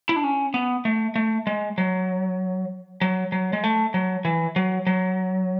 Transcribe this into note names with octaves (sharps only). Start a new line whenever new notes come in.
E4
D4
C#4
B3
A3
A3
G#3
F#3
F#3
F#3
G#3
A3
F#3
E3
F#3
F#3